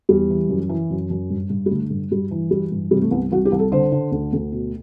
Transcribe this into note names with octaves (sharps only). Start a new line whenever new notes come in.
E2 G3
E3
F#2
E3
F#2
F#2
G2
G2
G3
D3 A3
G2
G2 G3
E3
E3 G3
G2
C3 G3
A3
C2 B3
C2 F#4
G4
C2
A4
D3 C5
D3
D2
D2
B2